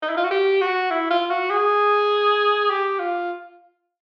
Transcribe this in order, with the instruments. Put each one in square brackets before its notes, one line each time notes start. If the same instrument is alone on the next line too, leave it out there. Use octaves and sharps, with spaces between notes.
[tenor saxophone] D#4
E4
F4
F#4
G4
F#4
E4
F4
F#4
G#4
G4
F4